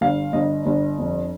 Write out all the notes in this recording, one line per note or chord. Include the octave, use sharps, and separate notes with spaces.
G1 F5
G1 D#5
G1
F2